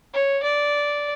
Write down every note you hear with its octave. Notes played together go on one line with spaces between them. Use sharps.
C#5
D5